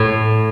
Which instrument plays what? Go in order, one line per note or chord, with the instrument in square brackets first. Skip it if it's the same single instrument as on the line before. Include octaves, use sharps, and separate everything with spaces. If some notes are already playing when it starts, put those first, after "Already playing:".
Already playing: [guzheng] A2